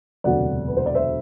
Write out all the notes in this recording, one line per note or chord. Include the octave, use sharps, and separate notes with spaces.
E1 D2 C3 F#3 D5 F#5
B4
C5
D5
C5 E5